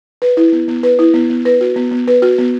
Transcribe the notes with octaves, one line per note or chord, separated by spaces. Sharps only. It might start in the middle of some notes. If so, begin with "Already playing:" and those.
B4
E4
B3
B3
B4
E4
B3
B3
B4
F#4
B3
B3
B4
F#4
B3